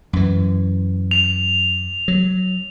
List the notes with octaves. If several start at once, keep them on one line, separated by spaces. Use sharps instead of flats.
F#2 E3
F7
F#3